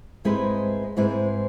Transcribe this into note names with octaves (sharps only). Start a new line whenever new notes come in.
G#2 G#3 C4 E4 B4
G#2 G#3 C4 E4 B4